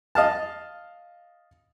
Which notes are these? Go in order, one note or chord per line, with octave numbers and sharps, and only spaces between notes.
D#5 F5 A5